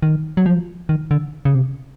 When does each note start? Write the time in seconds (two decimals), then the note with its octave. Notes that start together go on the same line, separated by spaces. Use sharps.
0.03 D#3
0.37 F#3
0.46 F3
0.89 D#3
1.11 D3
1.45 C#3
1.55 C3